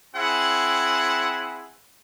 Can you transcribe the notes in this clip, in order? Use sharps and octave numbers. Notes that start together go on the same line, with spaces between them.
C4 E4 G#4 F#5